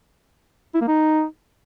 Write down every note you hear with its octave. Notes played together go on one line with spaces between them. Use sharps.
E4
A#3
D#4